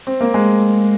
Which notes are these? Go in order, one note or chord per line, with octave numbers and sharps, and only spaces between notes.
C4
A#3
G#3